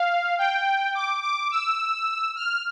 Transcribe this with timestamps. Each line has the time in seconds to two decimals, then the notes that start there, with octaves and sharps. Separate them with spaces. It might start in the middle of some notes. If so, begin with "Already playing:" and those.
Already playing: F5
0.38 G5
0.95 D6
1.22 D6
1.51 E6
2.36 F6